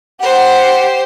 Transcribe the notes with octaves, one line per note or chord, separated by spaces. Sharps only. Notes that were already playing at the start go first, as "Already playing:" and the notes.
G4 C5 F#5